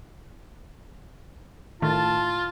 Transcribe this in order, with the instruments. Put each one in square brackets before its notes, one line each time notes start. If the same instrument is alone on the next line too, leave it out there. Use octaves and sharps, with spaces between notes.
[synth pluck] A2 D#3 A3 [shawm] F4 [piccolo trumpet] A5